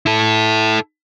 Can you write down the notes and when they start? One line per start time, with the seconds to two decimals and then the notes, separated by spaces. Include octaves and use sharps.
0.06 E4 A4